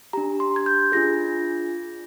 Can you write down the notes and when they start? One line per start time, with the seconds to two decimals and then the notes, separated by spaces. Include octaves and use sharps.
0.13 D4 G4 A#5
0.40 C6
0.56 G#6
0.66 G6
0.92 D4 F4 G#4 A#6